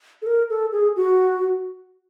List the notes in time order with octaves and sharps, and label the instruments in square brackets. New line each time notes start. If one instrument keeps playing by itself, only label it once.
[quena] A4
A#4
A4
G#4
F#4